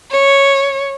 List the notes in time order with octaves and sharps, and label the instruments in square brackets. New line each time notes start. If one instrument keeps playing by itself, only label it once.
[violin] C#5